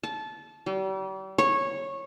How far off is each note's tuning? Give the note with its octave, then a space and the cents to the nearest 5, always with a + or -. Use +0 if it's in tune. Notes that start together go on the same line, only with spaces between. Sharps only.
A5 -20
G3 -40
C#5 -15